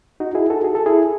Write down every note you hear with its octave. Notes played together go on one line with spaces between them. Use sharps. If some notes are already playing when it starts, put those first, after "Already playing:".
D#4 F#4
E4 G#4
F#4 A4
G#4
A4
E4 G#4